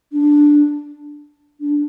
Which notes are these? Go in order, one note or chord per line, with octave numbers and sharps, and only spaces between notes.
D4
D4